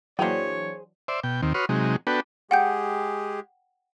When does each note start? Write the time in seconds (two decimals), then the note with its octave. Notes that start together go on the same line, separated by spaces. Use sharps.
0.19 E3 F#3 A#3 D4 G#4 C5 C#5 G5
1.08 C5 D5 E5
1.24 B2 G5
1.42 D#2 D#3 C4
1.54 F#4 B4 C#5 C6 D#6 F6
1.69 C3 F#3 G#3 D#4
2.07 B3 D4 F#4 A4 B4 G5
2.51 G#3 G4 G#4 F#5 G5 G6